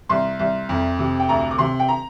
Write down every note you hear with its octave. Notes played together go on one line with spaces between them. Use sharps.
C2 C6
C2
F2
C3
G5
D2 A#5
D6
C3 C6
G5
A#5